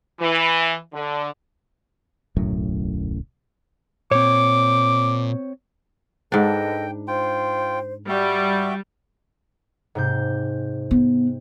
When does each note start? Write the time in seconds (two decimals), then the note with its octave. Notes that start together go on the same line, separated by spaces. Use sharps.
0.20 E3
0.93 D3
2.37 D1 B1 F#2 A2
4.12 A#2 C4 C#5 D6
6.32 G#2 D4 A4 B4 D#5 G5
7.08 F4 C5 G5
8.09 G3 F#4 D5 E5 G5
9.95 G#2 C3 G6
10.91 B3